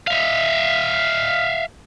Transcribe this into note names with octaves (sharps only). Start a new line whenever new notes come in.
E5 F5